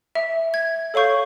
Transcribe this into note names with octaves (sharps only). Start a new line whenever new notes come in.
E5
G#6
A4 C#5 F5 C#6 G6